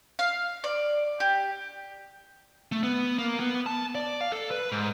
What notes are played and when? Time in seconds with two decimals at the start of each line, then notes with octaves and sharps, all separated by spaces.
0.19 F5
0.64 D5
1.20 G4
2.72 A3
2.83 B3
3.19 A#3
3.40 B3
3.66 A5
3.95 D5
4.21 F5
4.32 A4
4.51 B4
4.72 G#2